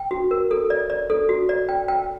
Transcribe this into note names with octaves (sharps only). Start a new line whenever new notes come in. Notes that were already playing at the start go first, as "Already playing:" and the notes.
Already playing: G5
F#4
A#4
A4
D5
D5
A4
F#4
D5
G5
G5